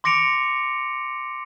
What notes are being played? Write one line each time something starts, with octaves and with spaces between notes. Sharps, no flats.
C6 D6 A#6 C#7 D7 F7